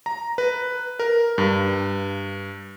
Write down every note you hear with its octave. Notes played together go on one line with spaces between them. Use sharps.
A#5
B4
A#4
G2